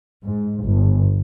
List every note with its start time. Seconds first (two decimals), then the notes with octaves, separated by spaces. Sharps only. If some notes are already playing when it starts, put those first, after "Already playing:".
0.23 G#2
0.64 G1